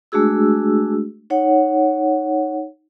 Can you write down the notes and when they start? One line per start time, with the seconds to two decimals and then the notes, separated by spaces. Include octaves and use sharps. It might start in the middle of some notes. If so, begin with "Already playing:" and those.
0.12 G#3 A3 D4 F#4 G#4 E6
1.30 D#4 C#5 F#5